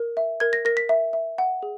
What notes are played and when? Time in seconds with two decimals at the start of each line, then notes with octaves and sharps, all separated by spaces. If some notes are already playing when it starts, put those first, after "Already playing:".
Already playing: A#4
0.17 E5
0.40 A#4 G#6
0.53 A#6
0.65 A#4 A#6
0.77 B6
0.89 E5
1.13 E5
1.38 F#5
1.63 G#4